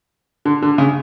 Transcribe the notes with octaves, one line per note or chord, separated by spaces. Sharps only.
D3
D3
C#3